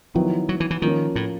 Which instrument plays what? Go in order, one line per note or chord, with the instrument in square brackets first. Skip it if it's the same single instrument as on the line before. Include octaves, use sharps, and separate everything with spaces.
[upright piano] D#3 F#3 B3 E4 [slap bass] F3
[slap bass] F#3
E3
E3
[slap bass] D#3 [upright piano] F3 A#3 C#4
[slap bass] A2